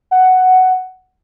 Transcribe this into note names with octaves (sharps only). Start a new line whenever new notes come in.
F#5